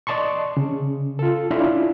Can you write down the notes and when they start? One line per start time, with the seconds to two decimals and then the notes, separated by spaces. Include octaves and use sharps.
0.07 D5 D#5 A5 C6 C#6
0.57 C#3
1.19 F4 A4
1.51 C#4 D4 E4 F4 B5